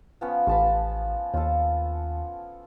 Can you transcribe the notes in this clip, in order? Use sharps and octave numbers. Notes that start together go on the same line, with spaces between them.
F3 B3 C#4
A1 F3 A5 B5
D#2 F4 A4